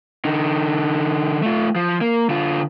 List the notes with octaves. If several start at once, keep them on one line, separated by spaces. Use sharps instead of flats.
D3 D#4
A3 F4
F3
A#3
D3 F4